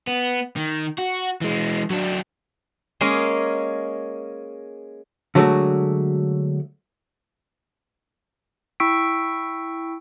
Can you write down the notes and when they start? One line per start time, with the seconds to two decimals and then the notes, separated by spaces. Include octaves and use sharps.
0.07 B3
0.56 D#3
0.99 F#4
1.41 E3 G#3
1.91 F#3 D4
3.01 G#3 A#3 C#4 A#4
5.35 D3 F#3 G#3 A3 F#4
8.80 E4 G5 C#6 E6 B6 D7